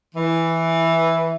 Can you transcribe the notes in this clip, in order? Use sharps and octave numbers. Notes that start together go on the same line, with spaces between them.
E3